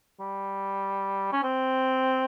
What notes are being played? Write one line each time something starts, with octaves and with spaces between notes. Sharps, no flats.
G3
C#4
C4